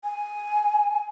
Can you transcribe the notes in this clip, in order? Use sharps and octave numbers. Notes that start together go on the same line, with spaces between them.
G#5